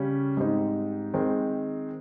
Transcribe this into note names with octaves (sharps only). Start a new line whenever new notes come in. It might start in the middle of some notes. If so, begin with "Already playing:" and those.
Already playing: C#3 G3 C#4
G#2 G3 C4 D#4
D#3 G#3 C4